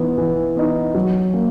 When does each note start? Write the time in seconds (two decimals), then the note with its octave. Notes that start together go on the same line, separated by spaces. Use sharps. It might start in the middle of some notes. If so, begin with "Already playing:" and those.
Already playing: E3 B3 D#4
0.18 E3
0.57 B3 D#4
0.94 F#3
1.34 A#3